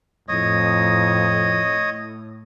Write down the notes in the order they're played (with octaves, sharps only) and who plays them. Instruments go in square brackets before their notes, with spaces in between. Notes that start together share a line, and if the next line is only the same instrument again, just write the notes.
[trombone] F2 [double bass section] A2 [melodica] C#5 D#5 D#6